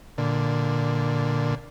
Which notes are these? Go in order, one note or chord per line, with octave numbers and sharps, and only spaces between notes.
A#2 D3